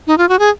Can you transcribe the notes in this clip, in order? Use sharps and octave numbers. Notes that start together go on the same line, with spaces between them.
D#4
F4
F#4
G#4